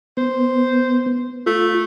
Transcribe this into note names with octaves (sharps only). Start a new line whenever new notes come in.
B3 C5
A3 F4